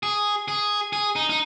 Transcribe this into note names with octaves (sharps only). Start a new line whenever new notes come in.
G#4
G#4
G#4
D#4
D#4